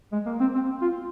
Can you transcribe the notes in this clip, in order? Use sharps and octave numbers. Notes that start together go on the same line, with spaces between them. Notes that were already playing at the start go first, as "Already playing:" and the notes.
G#3
A#3
C4
C4
F4